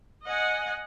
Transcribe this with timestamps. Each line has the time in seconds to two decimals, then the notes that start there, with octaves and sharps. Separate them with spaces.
0.24 D#5 F#5 G#5